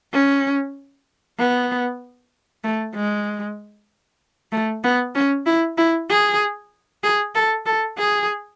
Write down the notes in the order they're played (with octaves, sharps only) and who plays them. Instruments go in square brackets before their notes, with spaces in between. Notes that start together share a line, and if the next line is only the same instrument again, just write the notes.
[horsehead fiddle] C#4
B3
A3
G#3
A3
B3
C#4
E4
E4
G#4
G#4
A4
A4
G#4